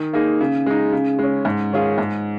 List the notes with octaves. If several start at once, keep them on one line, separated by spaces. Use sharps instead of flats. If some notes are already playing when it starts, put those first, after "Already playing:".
Already playing: D#3
A#3 D#4 G#4
C#3
G#3 D#4
C#3
G#3 C#4
G#2
D#3 C#4 F4 G#4
G#2